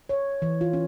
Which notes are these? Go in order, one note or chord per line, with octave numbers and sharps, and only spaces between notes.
C#5
E3
F4
C#4